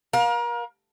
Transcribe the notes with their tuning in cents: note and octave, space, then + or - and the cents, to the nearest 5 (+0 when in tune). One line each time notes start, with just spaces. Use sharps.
A#4 +35 F5 +30